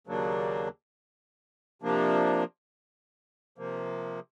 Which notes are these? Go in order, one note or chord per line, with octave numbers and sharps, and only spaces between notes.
D#2 C#3 F#3 A#3 D4
C3 F3 A#3 D4
C3 F3 A#3